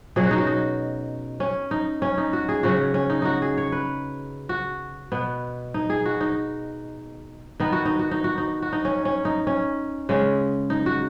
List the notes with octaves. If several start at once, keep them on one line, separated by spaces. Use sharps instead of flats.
B2 F#3 C#4 G#4
F#4
D#4
F#4
D#4
C#4
D#4
C#4
D#4
F#4
G#4
C#3 F#3 C#4 F#4
C#4
D#4
D#4 F#4
G#4
C#5
B4
F#4
B2 B3
D#4
G#4
F#4
D#4
D#3 B3 D#4
F#4
D#4
F#4
D#4
F#4
D#4
F#4
D#4
C#4
C#4
D#4
C#4
C#3 G#3 C#4
D#4
F#4